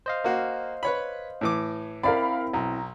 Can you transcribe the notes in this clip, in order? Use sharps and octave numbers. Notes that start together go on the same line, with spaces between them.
C5 D#5 F5
A#3 F#4
B4 C#5 B5
A2 E3 D6
C4 E4 A#4 D5 F5 B5
B1 A#5